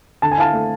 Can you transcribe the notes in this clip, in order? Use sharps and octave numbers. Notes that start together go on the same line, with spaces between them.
D3 A5
G#5
E4 F5 A5
A3